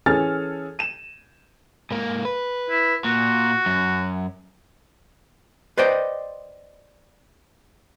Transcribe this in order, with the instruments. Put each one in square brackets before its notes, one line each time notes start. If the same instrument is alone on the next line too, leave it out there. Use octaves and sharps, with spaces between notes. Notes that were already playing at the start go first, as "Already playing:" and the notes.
[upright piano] E3 C#4 G#4 A4 F6 A6
D#7 E7
[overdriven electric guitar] G#2 A#3
B4
[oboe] E4
[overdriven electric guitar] A#2 [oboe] F#4
[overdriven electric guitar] F#2
[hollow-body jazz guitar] B4 C5 D5 D#5 G5